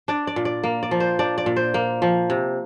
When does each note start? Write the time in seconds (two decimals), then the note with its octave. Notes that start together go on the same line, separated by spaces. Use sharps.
0.08 D4 D5
0.27 D5
0.36 A#2
0.45 D5
0.64 A#3
0.83 D5
0.91 F3
1.00 C5
1.19 D4 D5
1.38 D5
1.46 A#2
1.56 C5
1.74 A#3
2.02 F3
2.30 C3